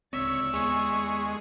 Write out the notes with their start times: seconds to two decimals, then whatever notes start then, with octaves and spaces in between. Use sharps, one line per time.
0.13 D1 C#2 C4 C#5 D5 E5
0.53 D#2 G#3 B3 C#6